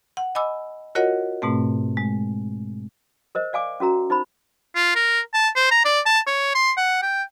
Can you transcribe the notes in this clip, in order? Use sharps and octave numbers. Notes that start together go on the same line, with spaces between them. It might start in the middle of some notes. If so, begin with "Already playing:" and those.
F#5
D#5 G#5 B5 D6 E6
F4 F#4 A#4 C#5 D#5 F#5
G#2 B2 A3 C4
G#3
A#4 C5 D#5
D5 F5 G#5 D6
C#4 F#4 A#4 A#5
D#4 C5 B5
F4
A#4
A5
C5
A#5
D5
A5
C#5
C6
F#5
G5